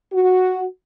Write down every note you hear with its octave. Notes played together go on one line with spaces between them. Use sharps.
F#4